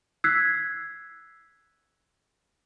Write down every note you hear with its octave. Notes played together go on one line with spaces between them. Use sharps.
E6 F#6 G#6 B6 C7